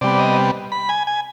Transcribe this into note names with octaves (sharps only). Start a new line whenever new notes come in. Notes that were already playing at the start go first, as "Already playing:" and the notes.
C3 G3 B3 D5
D#5
B5
G#5
G#5